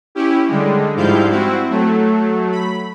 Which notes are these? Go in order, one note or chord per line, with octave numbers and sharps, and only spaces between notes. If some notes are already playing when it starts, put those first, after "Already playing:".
C#4 E4 G4
D3 G3 G#3
G#2 F3 G3 E4 F5 G6
C4 E4 F#4
F#3 A3
B5